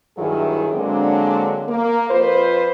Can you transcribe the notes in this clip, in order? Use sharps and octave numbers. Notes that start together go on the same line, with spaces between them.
G2 D#3 F#3 E4 G#4
D3 F#3 G#3 A#3 C4 D4
A#3
F2 F4 B4 C5